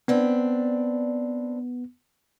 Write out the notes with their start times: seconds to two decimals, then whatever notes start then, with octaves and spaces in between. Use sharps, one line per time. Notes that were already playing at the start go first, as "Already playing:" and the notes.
0.08 B3 C4 D4 B4